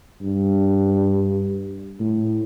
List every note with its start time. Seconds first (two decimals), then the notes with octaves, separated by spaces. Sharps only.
0.22 G2
2.00 A2